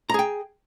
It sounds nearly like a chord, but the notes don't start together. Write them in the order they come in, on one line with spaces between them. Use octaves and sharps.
A#5 G#4 G5